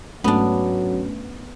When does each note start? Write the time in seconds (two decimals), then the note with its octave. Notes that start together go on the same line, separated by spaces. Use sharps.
0.24 G#2 F#3 A3 B3 C#4 D4